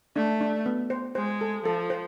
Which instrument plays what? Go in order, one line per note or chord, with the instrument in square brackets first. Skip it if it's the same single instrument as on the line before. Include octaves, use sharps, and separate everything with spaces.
[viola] A3 [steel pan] D4
[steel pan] D4
B3
C5
[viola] G#3 [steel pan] C5
[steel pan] A4
[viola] F3 [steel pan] A4
[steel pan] C5